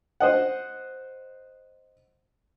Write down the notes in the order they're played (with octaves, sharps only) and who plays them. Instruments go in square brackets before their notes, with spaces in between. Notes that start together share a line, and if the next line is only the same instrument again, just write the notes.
[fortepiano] C5 D#5 F#5